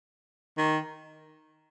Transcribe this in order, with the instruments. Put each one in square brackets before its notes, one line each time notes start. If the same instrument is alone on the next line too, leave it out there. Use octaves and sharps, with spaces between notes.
[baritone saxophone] D#3